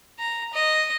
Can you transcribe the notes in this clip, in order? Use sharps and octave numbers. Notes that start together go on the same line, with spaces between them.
A#5
D#5